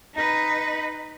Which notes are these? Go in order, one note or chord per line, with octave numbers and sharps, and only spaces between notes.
D#4 B4